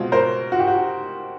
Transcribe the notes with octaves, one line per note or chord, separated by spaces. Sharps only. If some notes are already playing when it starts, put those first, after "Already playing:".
Already playing: B2 G#3 C4 F4
A#4 C5
F#4
G4
F#4